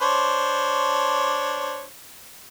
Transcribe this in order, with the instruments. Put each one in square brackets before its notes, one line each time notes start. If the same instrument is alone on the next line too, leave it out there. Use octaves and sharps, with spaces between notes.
[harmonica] D4 C5 C#5